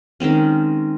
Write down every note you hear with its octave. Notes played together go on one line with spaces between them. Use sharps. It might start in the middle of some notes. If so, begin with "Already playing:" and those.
D#3 G#3 C4 C#4